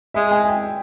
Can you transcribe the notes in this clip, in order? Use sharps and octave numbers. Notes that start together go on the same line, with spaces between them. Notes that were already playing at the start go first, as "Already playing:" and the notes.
G#3 E5
G#5
G5